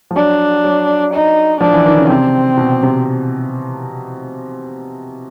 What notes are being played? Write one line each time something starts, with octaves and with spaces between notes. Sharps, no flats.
F3
F#3 D4
F#3
D#4
F3 D4
E3
D#3
C#3
C3 C4
B2
C3